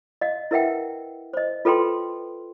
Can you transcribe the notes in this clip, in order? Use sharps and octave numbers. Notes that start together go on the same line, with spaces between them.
D#5 F5
E4 A#4 B4 E5 F#5 G5
C5 D#5
F4 A4 B4 G5 C6